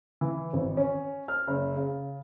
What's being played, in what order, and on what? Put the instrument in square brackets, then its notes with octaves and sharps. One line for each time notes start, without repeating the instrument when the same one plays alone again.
[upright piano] E3
G#1
C#4
F6
F#1
C#3